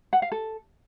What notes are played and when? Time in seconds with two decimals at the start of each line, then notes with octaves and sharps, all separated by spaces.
0.13 F#5
0.22 F5
0.32 A4